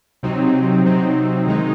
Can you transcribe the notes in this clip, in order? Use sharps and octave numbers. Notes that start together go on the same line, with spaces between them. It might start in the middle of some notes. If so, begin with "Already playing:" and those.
C3 F#3 C4 D#4
C3 F#3 C4 D#4
D#3 G#3 D#4